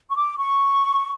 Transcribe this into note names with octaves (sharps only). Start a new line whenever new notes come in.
C#6
D6
C#6